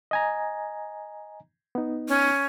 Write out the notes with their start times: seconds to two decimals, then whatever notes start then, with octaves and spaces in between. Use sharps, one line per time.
0.11 D#5 G#5 A#5
1.75 B3 D#4
2.09 C#4